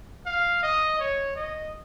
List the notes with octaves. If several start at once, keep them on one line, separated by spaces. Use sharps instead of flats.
F5
D#5
C#5
D#5